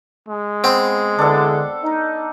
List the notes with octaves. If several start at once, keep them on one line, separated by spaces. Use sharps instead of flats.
G#3
B3 C4
E2 D3 D4 A4
D#4